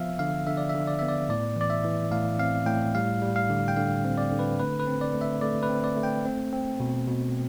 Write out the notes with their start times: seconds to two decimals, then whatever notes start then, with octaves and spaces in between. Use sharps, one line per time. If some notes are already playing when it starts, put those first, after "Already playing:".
Already playing: F3 B3 E5 F5
0.19 D3 F5
0.47 D3 E5
0.57 D5
0.69 D3 E5
0.87 D5
0.99 B3 E5
1.08 D5
1.29 A2 D5
1.56 E3 D5
1.70 E5
1.84 E3
2.11 A2 F5
2.39 C4 F5
2.66 A2 G5
2.95 G3 F5
3.22 G3
3.36 F5
3.50 D3
3.68 G5
3.76 D3 F5
4.05 C4
4.18 D5
4.32 D3
4.39 B4
4.59 A3 B4
4.80 B4
4.87 C4
5.01 D5
5.14 A3
5.21 E5
5.41 A3 D5
5.63 B4
5.69 C4
5.84 D5
5.97 A3
6.03 G5
6.25 C4
6.53 C4
6.80 B2
7.07 B2